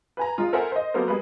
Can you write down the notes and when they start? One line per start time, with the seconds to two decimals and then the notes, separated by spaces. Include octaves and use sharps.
0.17 B4 G#5 A#5
0.38 G#3 F4
0.53 A4 A#4 C5 E5 F#5 G#5
0.72 C5 D#5
0.94 F#3 A#3 B3 A4 A#4 C5
1.08 G3 G#3 B4